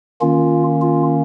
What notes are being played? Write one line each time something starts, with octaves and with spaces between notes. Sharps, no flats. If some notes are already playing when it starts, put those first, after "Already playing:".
D#3 A#3 C#4 F4
F4